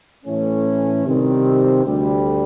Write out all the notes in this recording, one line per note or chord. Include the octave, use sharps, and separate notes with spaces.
A2 E3 A3 C#4
C3 D#3 G3 C4
D2 D3 G3